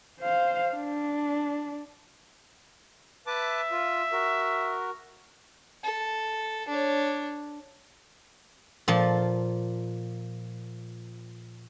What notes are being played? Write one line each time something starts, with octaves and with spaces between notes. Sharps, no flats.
C5 F5
D4
B4 E5 A5 D6
F4
F#4 A#4
A4
D4 C#5
A#2 F3 A5